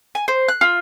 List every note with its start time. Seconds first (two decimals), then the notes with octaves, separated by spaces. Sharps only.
0.15 G#5
0.28 C5
0.48 F#6
0.61 F4